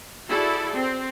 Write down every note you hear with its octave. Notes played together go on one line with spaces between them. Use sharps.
E4 F#4 G#4 A4 D5
C4